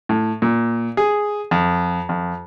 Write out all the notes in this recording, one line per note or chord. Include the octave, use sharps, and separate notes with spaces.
A2
A#2
G#4
F2
F2